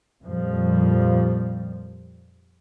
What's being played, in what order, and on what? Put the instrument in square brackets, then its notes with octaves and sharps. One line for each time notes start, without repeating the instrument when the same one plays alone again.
[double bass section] F2 A#2 F3 G3